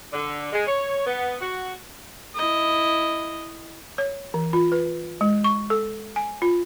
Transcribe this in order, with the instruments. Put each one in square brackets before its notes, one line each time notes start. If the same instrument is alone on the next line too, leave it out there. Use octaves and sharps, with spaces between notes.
[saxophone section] D3
G#3
C#5
B3
F#4
[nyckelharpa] E4 D#5
[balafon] C#5
E3
F4
B4
G#3
C#6
A4
G#5
F4